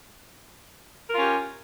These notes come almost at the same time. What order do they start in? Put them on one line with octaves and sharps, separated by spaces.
A#4 F4 C#4 G4